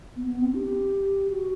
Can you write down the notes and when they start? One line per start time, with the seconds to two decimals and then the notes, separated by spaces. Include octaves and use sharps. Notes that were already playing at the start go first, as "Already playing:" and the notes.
0.16 B3
0.29 B3
0.41 C4
0.54 G4
1.30 F#4